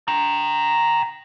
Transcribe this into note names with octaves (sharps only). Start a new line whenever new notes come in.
G5 A#5